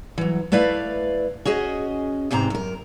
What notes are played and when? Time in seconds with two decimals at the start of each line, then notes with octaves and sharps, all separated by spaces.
0.18 E3 F#3
0.52 A3 E4 B4 D5 F5
1.45 C#4 F#4 G#4 D#5
2.31 E2 G#2 C3 C4 A#5
2.50 F#2 A#4